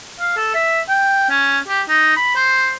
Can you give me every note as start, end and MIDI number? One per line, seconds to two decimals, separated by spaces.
0.20 0.33 77
0.37 0.51 69
0.55 0.81 76
0.88 1.27 79
1.29 1.59 61
1.68 1.81 67
1.89 2.14 63
2.17 2.32 83
2.35 2.74 72